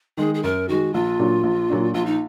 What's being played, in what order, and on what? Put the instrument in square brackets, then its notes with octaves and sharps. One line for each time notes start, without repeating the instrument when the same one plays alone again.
[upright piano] D#3 G#3 [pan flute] G#4
[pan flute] G#4
[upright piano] F#2 [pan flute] A#4
[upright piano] D#3 G#3 [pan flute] F#4
[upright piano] A#1 [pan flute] F4
[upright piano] A#2 F#3 D4
A#1
A#2 F#3 D4
[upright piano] A#1 [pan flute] F4
[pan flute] D#4